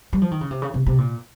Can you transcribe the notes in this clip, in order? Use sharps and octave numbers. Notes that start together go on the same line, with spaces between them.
G3
F3
D#3
C#3
C3
C#3
C3
C3
A#2